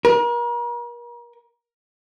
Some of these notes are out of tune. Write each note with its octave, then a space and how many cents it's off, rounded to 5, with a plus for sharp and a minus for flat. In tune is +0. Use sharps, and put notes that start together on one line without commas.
A#4 +40